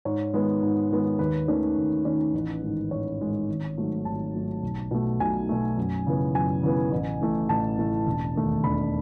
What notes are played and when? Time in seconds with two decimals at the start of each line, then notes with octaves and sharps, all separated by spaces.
0.05 G#2 C#5
0.33 D#3 G#3 B3
0.62 G#2
0.91 D#3 G#3 B3
1.19 D#2 B4
1.48 D#3 A3 C#4
1.77 D#2
2.05 D#3 A3 C#4
2.34 A1
2.62 G#2 D#3 G#3
2.91 A1 C#5
3.20 G#2 D#3 G#3
3.48 G#1
3.77 G#2 F#3 A3
4.05 G#1 A5
4.34 G#2 F#3 A3
4.63 B1
4.91 B2 A3
5.20 B1 G#5
5.49 B2 A3
5.77 F#2
6.07 C#3 E3 B3
6.34 F#2 G#5
6.63 C#3 E3 B3
6.91 A1
7.21 A2 E3 A3
7.49 A1 A5
7.77 A2 E3 A3
8.06 E1
8.35 D#2 D#3 A3
8.63 E1 B5